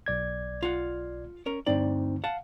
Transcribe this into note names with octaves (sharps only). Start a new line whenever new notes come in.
B1 D5 G#6
F4 F#5
C#4 A#4
D2 G2 C4 D#4 D5
F5 F#5 A5